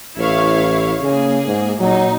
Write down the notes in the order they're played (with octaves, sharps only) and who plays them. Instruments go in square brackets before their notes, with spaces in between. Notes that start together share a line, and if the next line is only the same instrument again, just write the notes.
[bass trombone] A1 [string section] E4 C#5 F5
[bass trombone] C#3 [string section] A#3 G#4
[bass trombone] G#2
[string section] A#2 D#4 [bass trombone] F#3